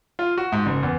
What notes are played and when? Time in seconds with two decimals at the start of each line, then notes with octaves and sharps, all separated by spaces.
0.19 F4
0.38 F#4
0.52 G#2
0.66 F#1
0.83 E2